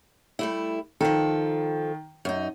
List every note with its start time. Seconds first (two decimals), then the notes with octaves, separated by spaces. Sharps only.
0.39 G3 A3 E4
1.01 D#3 F3 A4
2.25 F#2 D#4